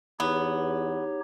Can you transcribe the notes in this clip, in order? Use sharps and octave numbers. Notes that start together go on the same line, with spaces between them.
E2 B3 D#4 G4 C#5